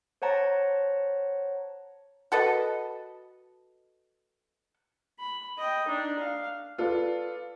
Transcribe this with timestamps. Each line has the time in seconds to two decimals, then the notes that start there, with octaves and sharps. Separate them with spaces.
0.22 C5 C#5 F#5 A5 A#5
2.32 F#4 A4 B4 D#5
5.19 B5
5.58 D#5 G5
5.88 D4 D#4
6.19 F5
6.78 F4 A4 B4 D5